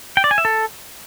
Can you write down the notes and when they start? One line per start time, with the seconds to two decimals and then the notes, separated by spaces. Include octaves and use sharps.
0.17 G5
0.24 D5
0.31 G#5
0.38 E5
0.45 A4